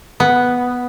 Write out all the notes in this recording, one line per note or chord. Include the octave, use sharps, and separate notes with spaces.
B3